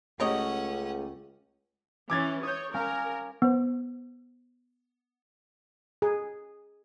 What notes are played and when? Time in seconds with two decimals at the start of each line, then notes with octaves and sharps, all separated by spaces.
0.20 C#2 A3 C#4 G4 A#4 C#5 D#5 F#5
2.10 E3 C#4 D6 G#6 A6
2.43 C#5 D#6 G6
2.74 C#4 A#4 F5 G#5
3.42 B3 C5
6.02 G#4